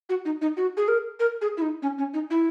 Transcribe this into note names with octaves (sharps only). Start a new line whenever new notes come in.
F#4
D#4
D#4
F#4
G#4
A#4
A#4
G#4
E4
D#4
C#4
C#4
D#4
E4